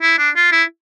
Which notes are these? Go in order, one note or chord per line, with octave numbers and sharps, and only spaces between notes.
E4
D4
F4
E4